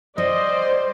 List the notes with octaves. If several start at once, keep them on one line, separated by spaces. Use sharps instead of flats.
G3 C5 D5 D#5